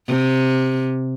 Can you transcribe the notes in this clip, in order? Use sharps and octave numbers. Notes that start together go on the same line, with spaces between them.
C3